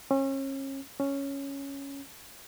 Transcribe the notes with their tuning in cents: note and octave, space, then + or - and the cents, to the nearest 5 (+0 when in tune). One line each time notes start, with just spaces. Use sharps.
C#4 -35
C#4 +0